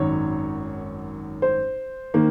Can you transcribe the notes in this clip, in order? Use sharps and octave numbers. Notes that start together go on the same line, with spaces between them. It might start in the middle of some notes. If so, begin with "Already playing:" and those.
Already playing: G#1 F#2 D#3 C#5
C5
D#3 A#3